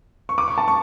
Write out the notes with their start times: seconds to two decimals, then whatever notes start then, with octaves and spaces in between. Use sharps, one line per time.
0.29 C#6
0.38 D6
0.48 C#6
0.58 A5
0.68 C#6